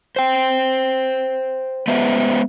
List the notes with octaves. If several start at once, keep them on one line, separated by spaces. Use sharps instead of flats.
C5 G5
G#3 B3 B4 C5 E5